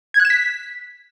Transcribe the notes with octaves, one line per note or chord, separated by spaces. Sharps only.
G#6
F#6
E7
B6